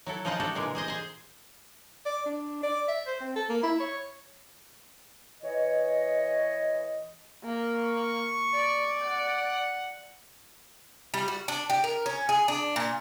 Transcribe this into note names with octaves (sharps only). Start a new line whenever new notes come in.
F#3 E4 A4
C#3 F3 D#4 F4 C5 F#5
F#4 G4 A4 F#5
A#2 D3 E3 G#3 A#3
G#4 C5 D#5
G#4 C5
D5
D4
D5
E5
C5
C4
A4
A#3
E4
C#5
E3 C#5 D#5
A#3
C#6
D5
F#5
G3
F#4
D4
G4
A#4
C#4
G#4
D4
A#2